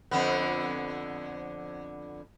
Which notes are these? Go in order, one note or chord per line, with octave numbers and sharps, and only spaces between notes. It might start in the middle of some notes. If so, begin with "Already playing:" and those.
F2 D3 B3